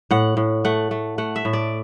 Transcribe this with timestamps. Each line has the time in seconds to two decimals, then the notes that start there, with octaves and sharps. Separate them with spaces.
0.11 A2 F#5
0.37 A2
0.65 A3 F#5
0.91 A3
1.18 A3 F#5
1.36 E5
1.45 A2
1.53 D5